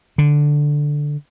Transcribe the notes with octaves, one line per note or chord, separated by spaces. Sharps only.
D3